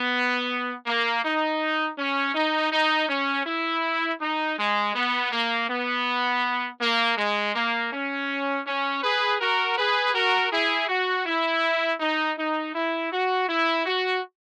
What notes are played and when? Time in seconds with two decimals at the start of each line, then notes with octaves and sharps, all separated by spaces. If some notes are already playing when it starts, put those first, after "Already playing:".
Already playing: B3
0.87 A#3
1.24 D#4
1.98 C#4
2.35 D#4
2.72 D#4
3.09 C#4
3.46 E4
4.21 D#4
4.58 G#3
4.95 B3
5.32 A#3
5.69 B3
6.80 A#3
7.18 G#3
7.56 A#3
7.92 C#4
8.67 C#4
9.03 G#4 B4
9.41 F#4 A#4
9.78 G#4 B4
10.15 F#4 A#4
10.52 E4 G#4
10.89 F#4
11.26 E4
12.00 D#4
12.38 D#4
12.75 E4
13.12 F#4
13.49 E4
13.86 F#4